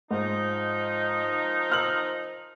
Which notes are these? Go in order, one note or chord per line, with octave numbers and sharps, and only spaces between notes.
G#2 D#3 F3 D#4
E6 F6 F#7